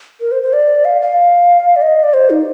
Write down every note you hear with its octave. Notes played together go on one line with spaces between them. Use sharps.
A#4
C5
C5
D5
F5
F5
D5
D#5
D5
C5
D#4